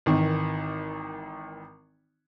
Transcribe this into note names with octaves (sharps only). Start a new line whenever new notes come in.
G#1 D#3 E3